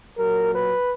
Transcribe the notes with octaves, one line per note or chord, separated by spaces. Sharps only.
A#2 F#3 A#4
B4